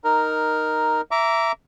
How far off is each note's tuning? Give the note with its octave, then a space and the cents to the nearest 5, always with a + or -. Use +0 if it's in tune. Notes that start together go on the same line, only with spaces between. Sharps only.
D#4 +0 A#4 +0
E5 +10 A#5 +0 D6 -25